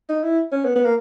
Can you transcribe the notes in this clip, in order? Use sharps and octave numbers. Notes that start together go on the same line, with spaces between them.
D#4
E4
C#4
B3
B3
A#3